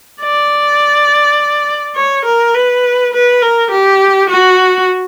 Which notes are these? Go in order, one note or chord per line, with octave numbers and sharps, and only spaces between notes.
D5
C#5
A#4
B4
B4
A#4
G4
F#4